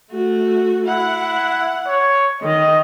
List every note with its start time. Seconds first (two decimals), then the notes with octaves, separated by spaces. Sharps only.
0.11 A3 F#4
0.87 E4 F#5
1.87 C#5
2.42 D#3 D#5